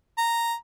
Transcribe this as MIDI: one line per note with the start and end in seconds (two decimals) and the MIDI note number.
0.18 0.54 82